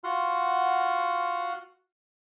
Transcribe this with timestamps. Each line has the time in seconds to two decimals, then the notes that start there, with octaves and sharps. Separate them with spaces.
0.04 F4 F#4 F#5 C6 F6